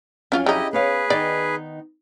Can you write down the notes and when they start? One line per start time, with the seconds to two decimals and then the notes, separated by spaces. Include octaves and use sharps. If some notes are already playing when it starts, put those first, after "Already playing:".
0.32 F2 F#3 C#4 F4 F5 G#5
0.46 C#3 D#4 E4 G4 D#5
0.73 B3 G#4 B4 C#5 F5
1.10 D#3 B3 D#4 D5